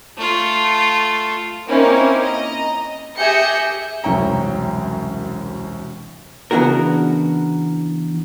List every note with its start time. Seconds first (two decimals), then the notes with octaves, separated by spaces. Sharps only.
0.18 A3 F4
1.68 A#3 C4 C#4 D#4 E4 A#4
2.22 D#5 A#5
3.17 G4 G#4 E5 G6 A#6 C#7
4.04 E1 C2 F#2 C#4 G5 A#5
6.51 C#3 E3 B3 D4 F#4 A#4